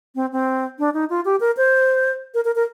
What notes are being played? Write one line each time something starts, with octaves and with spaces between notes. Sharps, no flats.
C4
C4
D4
D#4
F4
G4
A#4
C5
A#4
A#4
A#4